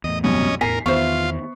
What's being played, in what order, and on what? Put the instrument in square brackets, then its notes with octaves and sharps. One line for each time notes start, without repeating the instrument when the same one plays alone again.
[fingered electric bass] E2 A2 [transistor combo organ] D#5
[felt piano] C2 F#2 B2 [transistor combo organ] C#4 D#5
[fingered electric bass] E2 A2 B3 [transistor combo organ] A#4 [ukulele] G#5 [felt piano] B6 C7
[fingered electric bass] E2 D#3 [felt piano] B3 C#6 [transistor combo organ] F4 [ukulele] C5 E5